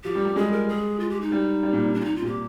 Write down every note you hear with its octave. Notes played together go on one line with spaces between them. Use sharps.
F3 G4
G3
G3
G#3 G#4
A#4
G#4
F4
G4
D#4
G3
G3
A#2
C3
D4
F4
D#4
F4
A#2
C3 G4